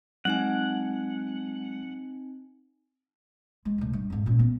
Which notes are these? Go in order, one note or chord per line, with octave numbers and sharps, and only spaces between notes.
F#3 G#3 C4 D#4 F#5 G#5
G#3
D2 C3
G2
F2 G#2
A#2 C#4
B3